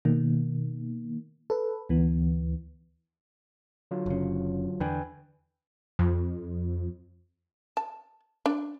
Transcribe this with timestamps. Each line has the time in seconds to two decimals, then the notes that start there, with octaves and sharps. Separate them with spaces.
0.05 B2 D#3 A#3
1.50 A4 B4
1.89 D2 E3 B3
3.91 D3 F#3 F4
4.06 F#1 C#3
4.80 E2 D3 B4 G5 G#5
5.99 F2
7.77 A5
8.46 D4